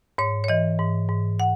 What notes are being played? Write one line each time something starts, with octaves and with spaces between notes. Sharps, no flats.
G#2 C#5
C#5
E3 D#5
G#2
G#2
F#5